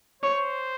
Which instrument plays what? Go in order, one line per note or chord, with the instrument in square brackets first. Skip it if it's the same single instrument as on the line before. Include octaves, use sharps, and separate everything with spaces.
[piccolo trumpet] C5 [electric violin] C#5